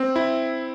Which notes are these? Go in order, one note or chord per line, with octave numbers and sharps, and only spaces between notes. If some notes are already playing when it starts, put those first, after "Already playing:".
Already playing: C4
E4